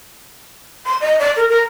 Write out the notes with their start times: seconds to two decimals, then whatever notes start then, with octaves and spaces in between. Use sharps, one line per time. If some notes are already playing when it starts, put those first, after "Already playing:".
0.86 C6
1.01 D#5
1.19 D5
1.36 A#4
1.49 A#4